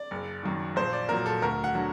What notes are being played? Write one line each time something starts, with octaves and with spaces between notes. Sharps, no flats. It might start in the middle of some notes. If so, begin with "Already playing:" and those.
Already playing: D5
F#1
F#2 D#3
A#1 C5
D5
A#2 F#3 A#4
A4
D2 A#4
F#5
D3 F#3